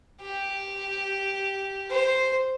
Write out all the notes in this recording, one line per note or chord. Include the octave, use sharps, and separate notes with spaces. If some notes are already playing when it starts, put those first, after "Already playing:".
G4
C5